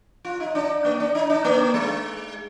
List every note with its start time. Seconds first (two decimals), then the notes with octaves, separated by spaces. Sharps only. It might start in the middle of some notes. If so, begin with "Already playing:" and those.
0.25 F4
0.40 D#4
0.55 D4
0.85 A#3
1.00 D4
1.15 D#4
1.30 D4
1.45 A#3
1.74 G#3